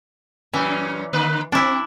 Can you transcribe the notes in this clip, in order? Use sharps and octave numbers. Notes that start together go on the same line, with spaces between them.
F#2 A#2 E3 C#4
D3 A#3 B4
C4 D4 E4